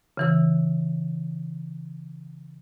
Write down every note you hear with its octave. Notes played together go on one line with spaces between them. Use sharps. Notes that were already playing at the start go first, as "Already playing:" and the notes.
C#3 E3 E6